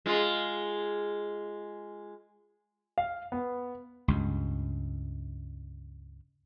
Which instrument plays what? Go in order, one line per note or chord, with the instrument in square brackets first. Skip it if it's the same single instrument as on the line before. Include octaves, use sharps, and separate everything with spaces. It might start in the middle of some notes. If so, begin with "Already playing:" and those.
[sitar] G#3 F4
[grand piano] F5
B3
[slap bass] C#2 G2